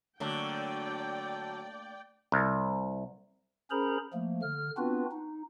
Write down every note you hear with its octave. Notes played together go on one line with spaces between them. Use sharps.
D3 F#3 A3 A#3 D4 D5 G5
C2
C#4 G#4 A#4 C5 A#5 B5
F3 A3 A#3
D3 F6
B3 C4 D4 F4 F#4 B4
D#4